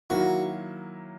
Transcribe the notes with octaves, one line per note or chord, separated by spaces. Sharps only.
D#3 F#3 A#3 E4 F#4